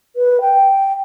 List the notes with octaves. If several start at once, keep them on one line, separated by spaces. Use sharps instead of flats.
B4
G5